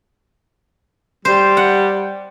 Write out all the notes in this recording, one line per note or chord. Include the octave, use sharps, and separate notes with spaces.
G3 C5
F#5